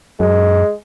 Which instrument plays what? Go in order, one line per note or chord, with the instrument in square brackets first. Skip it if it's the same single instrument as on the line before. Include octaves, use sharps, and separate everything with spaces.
[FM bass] F#2 [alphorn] G#3